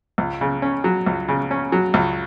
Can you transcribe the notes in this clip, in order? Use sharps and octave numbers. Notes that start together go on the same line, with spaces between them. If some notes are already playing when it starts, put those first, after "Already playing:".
C#2
C#3
C#4
F#3
C#2
C#3
C#4
F#3
C#2